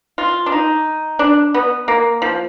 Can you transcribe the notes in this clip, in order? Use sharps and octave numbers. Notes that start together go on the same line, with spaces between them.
F4
D4
D#4
D4
B3
A#3
F3